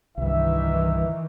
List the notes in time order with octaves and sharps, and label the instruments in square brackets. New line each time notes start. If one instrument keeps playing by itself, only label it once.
[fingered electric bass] C2 G2 [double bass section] D#3 E3 [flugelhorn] E5